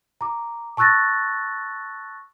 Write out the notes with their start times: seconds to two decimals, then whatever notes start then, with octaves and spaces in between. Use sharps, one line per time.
0.21 A#5 D6
0.77 A5 C#6 E6 F#6 A6 A#6